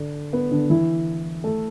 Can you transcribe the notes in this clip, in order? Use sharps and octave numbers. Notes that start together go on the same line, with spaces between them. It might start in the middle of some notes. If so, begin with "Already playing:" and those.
Already playing: D3 D4
B3
D3 D4
E3 E4
A3 A4